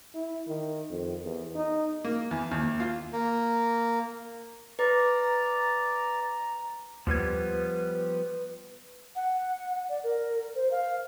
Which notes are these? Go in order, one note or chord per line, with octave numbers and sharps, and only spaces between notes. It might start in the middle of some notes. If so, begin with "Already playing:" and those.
E4
D#3
F2
E2
D#4
A#3
E2
D#2
F4
A#3
B4 D5 A#5
D#2 F3 G3 B3 B4 G#6
F#5
D5
A#4
C5
F5